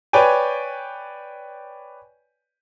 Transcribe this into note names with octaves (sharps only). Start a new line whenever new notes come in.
B4 C#5 D5 G5 G#5